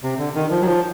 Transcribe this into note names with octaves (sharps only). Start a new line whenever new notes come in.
C3
D3
D#3
F3
F#3
F3